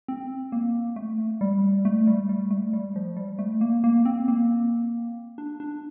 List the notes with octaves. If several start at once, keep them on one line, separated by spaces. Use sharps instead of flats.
C4
A#3
A3
G3
A3
G3
G3
A3
G3
F3
G3
A3
A#3
A#3
C4
A#3
D4
D4